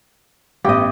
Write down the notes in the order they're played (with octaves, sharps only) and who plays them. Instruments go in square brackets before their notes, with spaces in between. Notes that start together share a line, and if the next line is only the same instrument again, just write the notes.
[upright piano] A1 G2 B3 [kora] G4 D#5